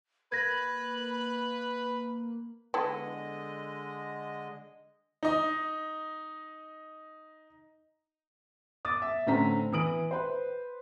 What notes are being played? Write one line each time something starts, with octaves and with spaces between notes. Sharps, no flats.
A#3 B4 B5 G#6 A#6
D3 G#3 B3 E4 A4 D#5
D#4 D#5
D6 D#6 A6
E5
A2 D3 C4 C#4 A#5 B6
E3 E4 D#6 D7 F#7
B4 C5